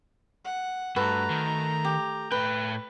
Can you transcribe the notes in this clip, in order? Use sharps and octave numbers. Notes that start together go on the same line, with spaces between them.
F#5
G2 A3 F#4 A4 B4 A#5
D#3
G4
A2 B4 G5